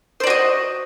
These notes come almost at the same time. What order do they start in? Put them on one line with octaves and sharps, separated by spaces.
C5 D5 F#4 D#5